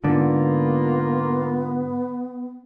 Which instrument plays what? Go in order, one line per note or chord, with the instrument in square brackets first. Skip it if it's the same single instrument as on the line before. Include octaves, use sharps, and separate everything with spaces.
[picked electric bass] G#2 D3 [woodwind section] A#3 F4 [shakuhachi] B3